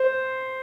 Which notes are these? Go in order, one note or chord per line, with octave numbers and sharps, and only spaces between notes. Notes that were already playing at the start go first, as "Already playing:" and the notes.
Already playing: C5